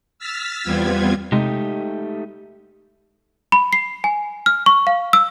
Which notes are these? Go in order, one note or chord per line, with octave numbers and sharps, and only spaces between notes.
E6 F6 A6 B6
E2 G3 B3 C4 F4 G#6
C3 G#3 A3 D#4 G4
B5
C7
G#5
F6
C#6
F5
E6